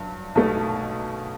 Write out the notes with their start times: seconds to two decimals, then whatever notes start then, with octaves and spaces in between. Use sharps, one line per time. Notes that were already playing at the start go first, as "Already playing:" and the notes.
Already playing: G2 F#3
0.35 B1 B2 A3